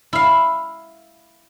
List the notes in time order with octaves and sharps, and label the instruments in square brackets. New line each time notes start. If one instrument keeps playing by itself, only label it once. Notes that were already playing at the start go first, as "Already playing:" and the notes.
[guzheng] E4 F5